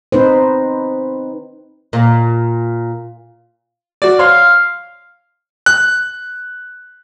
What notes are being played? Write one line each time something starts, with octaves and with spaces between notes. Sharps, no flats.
C4 D#4 B4 C5
A#2
F#4 D5
C#5 F5 C6
F#6